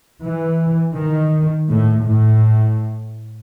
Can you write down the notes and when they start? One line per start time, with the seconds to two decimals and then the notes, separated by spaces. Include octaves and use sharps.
0.23 E3
0.96 D#3
1.69 A2
2.04 A2